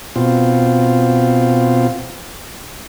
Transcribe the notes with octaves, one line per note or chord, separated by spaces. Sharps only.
B2 C4 F4